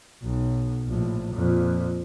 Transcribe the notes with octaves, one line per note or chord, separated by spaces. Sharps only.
B1
A#1 A2
F2 A#2